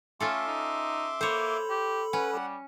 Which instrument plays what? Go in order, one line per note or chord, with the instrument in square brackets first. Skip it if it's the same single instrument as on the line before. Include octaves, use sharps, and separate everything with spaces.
[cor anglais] A3 [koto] C#4 F4 A4 [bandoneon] E5 C6 D6
[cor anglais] D#4
[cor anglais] A#3 [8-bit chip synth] A4 B5 [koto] C5 C#5
[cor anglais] G4
[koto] C#4 [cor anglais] B4 [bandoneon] F#5
[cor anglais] G3